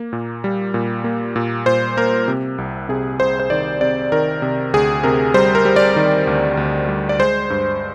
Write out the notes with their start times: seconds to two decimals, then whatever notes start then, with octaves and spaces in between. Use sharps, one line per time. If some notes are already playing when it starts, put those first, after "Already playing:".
Already playing: A#3
0.13 A#2
0.44 G3
0.74 A#2
1.04 A#3
1.36 A#2
1.66 A#2 C5
1.97 A#3 A#4
2.28 C3
2.58 C2
2.89 C3 G#4
3.20 C2 C5
3.40 C5
3.50 D#3 D5
3.81 C3 D5
4.12 D#3 A#4
4.42 C3
4.73 D2 G#4
5.03 C3 A#4
5.34 G3 C5
5.55 A#4
5.65 G3
5.76 D5
5.96 D#3
6.27 D2
6.57 D2
6.88 G3
7.09 D5
7.19 G#3 C5
7.50 G2